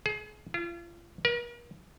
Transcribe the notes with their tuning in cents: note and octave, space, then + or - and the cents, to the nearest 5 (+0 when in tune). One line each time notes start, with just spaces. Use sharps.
G#4 +30
F4 -35
A#4 +40